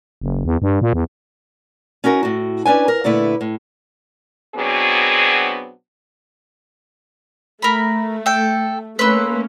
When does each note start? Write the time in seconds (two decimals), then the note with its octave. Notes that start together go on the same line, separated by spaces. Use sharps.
0.21 F#1
0.45 E2
0.62 G2
0.82 A#2
0.93 E2
2.04 C#4 D#4 F#4 A#4
2.23 A2 F#4
2.66 C#4 D4 B4 G#5
2.88 A#4
3.04 A#2 D3 A3 E4 B4
3.41 A2
4.55 B2 F#3 B3 C4 D4 G#4
7.62 A3 A#4 B5
8.26 A4 G5
8.99 A3 A#3 C#4 B4 C6 E6